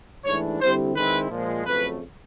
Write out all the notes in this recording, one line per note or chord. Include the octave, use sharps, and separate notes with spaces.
G#2 E3 A3 D4 C#5
D3 G3 C4 E4 C5
D#3 G#3 C4 E4 B4
A#2 F3 G#3
F2 C#3 F#3 A3 B4